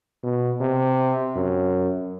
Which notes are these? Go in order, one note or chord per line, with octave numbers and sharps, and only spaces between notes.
B2
C3
F#2